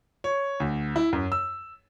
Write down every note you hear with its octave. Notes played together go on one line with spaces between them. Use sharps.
C#5
D2
E4
F#2
E6